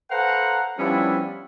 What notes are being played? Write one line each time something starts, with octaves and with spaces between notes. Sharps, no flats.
A4 B4 C5 F5 F#5 A#5
F3 G3 B3 C#4 D4 E4